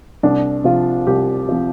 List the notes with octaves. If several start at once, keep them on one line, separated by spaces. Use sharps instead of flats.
C2 D4
C3 F3 F4
C2 G4
C3 F3